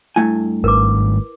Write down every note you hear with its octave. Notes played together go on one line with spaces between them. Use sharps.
G2 A3 E4 G#5
G#1 A#4 B4 D6